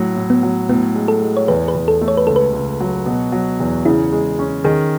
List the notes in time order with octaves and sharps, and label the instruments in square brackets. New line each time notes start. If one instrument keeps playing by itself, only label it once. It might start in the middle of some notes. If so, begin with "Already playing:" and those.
Already playing: [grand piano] A2 F#3 [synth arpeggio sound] A3
[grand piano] A2
[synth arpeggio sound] B3
[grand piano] F#3
[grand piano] A2 [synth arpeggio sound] B3
[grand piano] G#3
[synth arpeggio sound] A4
[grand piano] G#3
[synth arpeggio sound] C#5
[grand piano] E2 [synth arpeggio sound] B4
[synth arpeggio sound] B4
[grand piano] E2
[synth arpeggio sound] A4
[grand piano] A3
[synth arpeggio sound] C#5
B4
[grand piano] C#2 [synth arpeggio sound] A4
[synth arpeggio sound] B4
[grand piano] C#2
F#3
B2
F#3
E2
[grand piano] C#3 [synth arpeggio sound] E4
[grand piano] G#3
C#4
[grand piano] D#3 [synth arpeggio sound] G#4